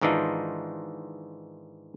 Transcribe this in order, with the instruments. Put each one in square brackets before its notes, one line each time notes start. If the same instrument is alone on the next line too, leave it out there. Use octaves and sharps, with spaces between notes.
[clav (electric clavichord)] G#2 D#3 E3 D4 D#4 F4